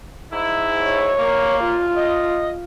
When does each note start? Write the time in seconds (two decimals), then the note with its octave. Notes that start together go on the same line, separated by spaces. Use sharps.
0.31 G#2 E4
0.85 C#5
1.18 A#3
1.64 F4
1.96 D#5